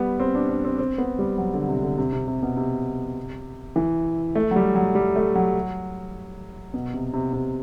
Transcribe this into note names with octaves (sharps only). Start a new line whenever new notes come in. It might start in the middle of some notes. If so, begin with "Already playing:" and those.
Already playing: G3 B3
C4
D4
D4
C4
C4
B3
G3
F#3
D3
C3
D3
C3
C3
C3
B2
C3
E3
A3
F#3
G3
F#3
G3
A3
F#3
B2
C3
C3
C3